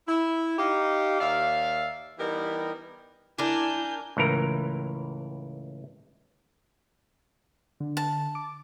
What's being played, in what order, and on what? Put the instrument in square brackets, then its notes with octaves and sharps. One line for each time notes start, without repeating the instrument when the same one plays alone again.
[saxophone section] E4
D#4 G4 F5
D#2 D5 E5 F5
E3 G3 B3 D#4 G4 A#4
[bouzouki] D4 A#4 [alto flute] E4 [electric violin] G#5 G6
[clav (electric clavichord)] C#2 A2 E3 A#4
[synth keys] D3
[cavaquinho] A5
[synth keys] D6